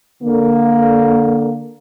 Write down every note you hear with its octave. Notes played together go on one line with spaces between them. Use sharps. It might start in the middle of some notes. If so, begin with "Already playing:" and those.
D3 A#3